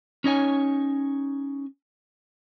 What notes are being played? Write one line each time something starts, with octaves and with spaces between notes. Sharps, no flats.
C#4 D#4 C#5 G#5